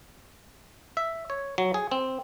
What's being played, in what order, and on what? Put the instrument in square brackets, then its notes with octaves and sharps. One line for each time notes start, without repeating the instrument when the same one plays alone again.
[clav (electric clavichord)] E5
C#5
F#3
G#4
C4